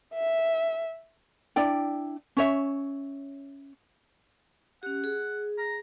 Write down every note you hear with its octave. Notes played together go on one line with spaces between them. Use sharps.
E5
D4 E4 D5 G5
C#4 C#5 E5
C#4 G4 F#5
G#4
A#5